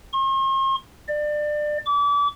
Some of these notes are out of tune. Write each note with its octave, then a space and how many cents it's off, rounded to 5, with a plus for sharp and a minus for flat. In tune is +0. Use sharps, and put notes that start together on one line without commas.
C6 +45
D5 +25
D6 -35